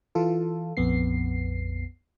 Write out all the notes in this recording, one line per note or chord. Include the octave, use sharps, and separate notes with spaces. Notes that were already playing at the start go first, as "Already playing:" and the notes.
E3 F4 A4
A#1 F2 B3 C7